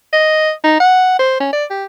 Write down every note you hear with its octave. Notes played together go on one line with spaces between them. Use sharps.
D#5
D#4
F#5
C5
C#4
D5
G4